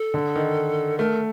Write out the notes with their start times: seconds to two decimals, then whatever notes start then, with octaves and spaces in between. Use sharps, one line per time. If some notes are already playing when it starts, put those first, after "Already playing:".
Already playing: A4
0.14 D3
0.35 D#3
0.98 A3 A#4